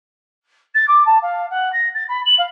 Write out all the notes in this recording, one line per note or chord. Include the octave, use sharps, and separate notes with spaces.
A6
D6
A5
F5
F#5
A#6
A6
B5
F#7
F5